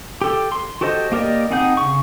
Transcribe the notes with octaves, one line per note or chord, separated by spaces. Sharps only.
G4 A4
C6
F#4 G4 A4 C5 D#5
A#3 G4 A#4 D5 D#5
C4 D#4 G#4 F#5 G6
C#3 C#6